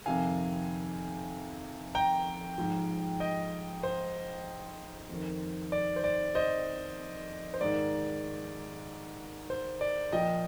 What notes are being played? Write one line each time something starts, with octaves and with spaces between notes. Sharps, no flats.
F2 C3 D#3 F5 G#5
G5 A#5
G#2 F3
D#5 G5
C5
F2 D#3
D5
C5
D5
C5 D#5
C5
G#2 D#3 D5
C5
D5
A#2 F3 D#5 G5